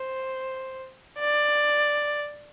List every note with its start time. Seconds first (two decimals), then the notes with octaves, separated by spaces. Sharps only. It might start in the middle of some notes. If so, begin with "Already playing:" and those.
Already playing: C5
1.19 D5